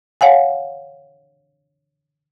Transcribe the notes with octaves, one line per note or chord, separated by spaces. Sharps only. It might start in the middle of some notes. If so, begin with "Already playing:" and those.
C#5 F5 F#5 G#5